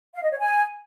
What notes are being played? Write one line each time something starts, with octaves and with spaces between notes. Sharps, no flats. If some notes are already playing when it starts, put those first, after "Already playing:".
F5
D#5
C#5
G#5